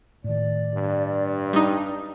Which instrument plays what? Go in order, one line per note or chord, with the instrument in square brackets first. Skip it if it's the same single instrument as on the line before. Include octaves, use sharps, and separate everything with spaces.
[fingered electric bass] A2 D#3 [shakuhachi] D5
[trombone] G2
[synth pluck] G3 D#4